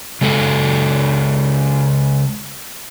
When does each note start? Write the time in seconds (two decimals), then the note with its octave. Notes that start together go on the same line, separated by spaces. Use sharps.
0.21 C#3 G#3 A4